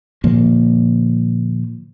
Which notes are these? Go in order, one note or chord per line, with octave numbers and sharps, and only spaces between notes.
A#2 D3 F3 A#3